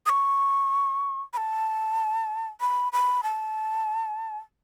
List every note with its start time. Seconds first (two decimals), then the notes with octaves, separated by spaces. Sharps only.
0.06 D#6
0.09 C#6
1.33 B5
1.37 A5
2.61 B5
2.93 B5
3.23 A5